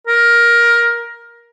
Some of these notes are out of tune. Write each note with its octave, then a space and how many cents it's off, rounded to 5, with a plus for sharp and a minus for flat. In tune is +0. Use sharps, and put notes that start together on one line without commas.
A#4 +15